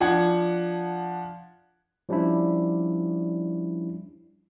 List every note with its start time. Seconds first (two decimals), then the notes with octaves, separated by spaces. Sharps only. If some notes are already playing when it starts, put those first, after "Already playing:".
0.01 F3 D4 F#5 G#6
2.09 F3 G3 C#4 D4 E4